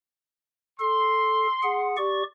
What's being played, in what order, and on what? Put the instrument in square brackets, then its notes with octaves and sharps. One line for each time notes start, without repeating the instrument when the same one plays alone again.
[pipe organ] A4 [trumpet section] C6
[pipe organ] G#4 F#5
G4 D5 C#6